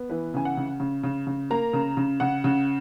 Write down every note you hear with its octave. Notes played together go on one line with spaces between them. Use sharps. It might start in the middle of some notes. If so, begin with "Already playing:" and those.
Already playing: B3
E3 B4
C#3 G#5
F#5
C#3
C#3
C#3
C#3
A#3 A#5
C#3
C#3
C#3 F#5
C#3